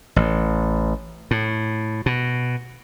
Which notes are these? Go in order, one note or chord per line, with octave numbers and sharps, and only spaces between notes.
A1
A2
B2